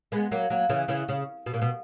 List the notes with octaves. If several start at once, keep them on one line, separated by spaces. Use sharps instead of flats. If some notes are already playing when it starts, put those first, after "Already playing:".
G#3 B3
F#3 A#3
F#3 A#3
C#3 E3
C#3 E3
C#3
B2
A#2
B2